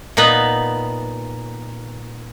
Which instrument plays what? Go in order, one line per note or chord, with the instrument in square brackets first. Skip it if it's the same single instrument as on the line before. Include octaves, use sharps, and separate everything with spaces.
[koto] A#2 B3 D#4 B4